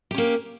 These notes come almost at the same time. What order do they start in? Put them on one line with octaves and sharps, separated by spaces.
G4 C#4 A#3